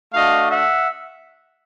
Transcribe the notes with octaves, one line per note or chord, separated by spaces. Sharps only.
A3 D4 F#4 D#5 F5
E5 F#5